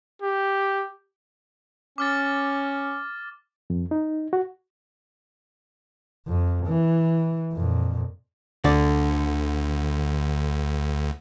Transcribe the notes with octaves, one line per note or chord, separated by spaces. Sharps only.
G4
C#4 D6 F6 A6
F2
D#4
F#4
F2
E3
F2 A#2
D2 D3 D5